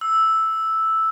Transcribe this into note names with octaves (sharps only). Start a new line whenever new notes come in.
E6